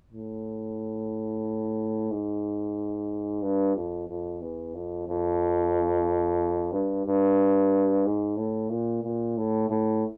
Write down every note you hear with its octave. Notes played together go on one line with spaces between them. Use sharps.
A2
G#2
G2
F2
F2
E2
F2
F2
G2
G2
G#2
A2
A#2
A#2
A2
A2